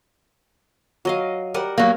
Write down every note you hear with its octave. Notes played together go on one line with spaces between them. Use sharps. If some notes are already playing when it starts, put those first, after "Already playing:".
F#3 D#5 F5
G3 A#4 F#5
F#3 A#3